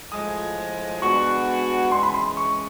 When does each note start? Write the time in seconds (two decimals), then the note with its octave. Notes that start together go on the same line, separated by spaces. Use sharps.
0.12 A2 F3 G#3 D#6
1.02 G#3 B3 D4 F#4 C#6
1.92 C#3 E3 G#3 C6
2.03 B5
2.14 C6
2.37 C#6